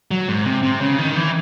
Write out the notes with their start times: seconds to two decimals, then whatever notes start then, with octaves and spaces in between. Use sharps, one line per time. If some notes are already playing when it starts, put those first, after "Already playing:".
0.11 F#3
0.28 G#2
0.45 C3
0.63 C3
0.81 C#3
0.98 D#3
1.16 E3